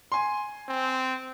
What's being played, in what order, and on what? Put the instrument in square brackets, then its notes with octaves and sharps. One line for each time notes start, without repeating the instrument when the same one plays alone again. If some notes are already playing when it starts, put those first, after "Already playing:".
[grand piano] G#5 C6
[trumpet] C4